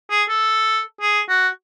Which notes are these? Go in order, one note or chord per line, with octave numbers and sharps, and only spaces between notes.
G#4
A4
G#4
F#4